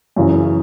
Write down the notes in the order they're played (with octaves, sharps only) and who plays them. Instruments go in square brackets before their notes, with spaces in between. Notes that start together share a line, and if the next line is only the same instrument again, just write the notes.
[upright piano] F#2 C#3 E3